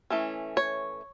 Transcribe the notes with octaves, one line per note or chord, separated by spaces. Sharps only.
E3 A3 C#4
C#5